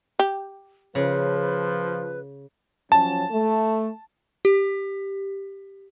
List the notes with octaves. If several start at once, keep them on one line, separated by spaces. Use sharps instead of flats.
G4
C#3 F3 B4
F3 F#3 C#4 A5
A3
G4